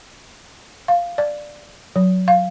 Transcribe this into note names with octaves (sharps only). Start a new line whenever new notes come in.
F5
D5
F#3
F5